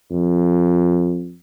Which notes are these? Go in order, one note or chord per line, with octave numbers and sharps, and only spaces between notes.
F2